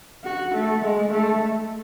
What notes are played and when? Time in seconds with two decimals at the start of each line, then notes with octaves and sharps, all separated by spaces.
0.25 F#4
0.54 A3
0.84 G#3
1.13 A3